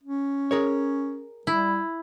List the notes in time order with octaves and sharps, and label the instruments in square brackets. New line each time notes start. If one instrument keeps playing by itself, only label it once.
[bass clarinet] C#4
[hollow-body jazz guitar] G#4 A#4 C#5
[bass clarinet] G3 [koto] E4